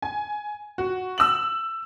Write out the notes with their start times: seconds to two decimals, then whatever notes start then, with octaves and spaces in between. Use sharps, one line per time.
0.02 G#5
0.78 F#4
1.18 E6 F#7